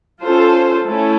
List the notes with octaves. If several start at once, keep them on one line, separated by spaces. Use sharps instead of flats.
C#4 F4 A4 C5
A3 C#4 E4 A4